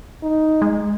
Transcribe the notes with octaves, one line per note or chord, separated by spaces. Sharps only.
D#4
G#3